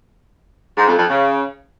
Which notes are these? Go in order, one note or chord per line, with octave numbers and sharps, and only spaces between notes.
G#2
F2
F2
C#3